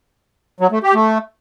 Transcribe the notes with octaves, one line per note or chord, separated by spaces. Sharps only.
F#3
A3
G4
A3